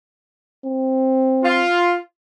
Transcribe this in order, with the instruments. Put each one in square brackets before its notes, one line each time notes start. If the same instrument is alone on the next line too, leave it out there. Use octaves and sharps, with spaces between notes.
[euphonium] C4
[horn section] F4